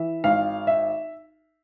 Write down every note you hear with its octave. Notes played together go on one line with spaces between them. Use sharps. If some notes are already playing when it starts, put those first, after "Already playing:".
Already playing: E3 E5
G#1 F5
E5